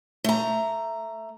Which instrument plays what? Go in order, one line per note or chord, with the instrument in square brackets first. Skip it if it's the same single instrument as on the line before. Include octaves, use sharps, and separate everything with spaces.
[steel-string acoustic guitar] A3 A#5